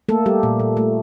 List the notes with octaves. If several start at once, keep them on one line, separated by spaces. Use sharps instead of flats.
A3 A#3 A4
G3 G4
A#2
A#2
A3